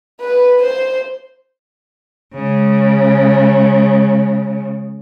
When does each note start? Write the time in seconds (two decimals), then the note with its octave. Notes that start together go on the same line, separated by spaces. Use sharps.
0.21 B4
0.63 C5
2.34 C#3 G#3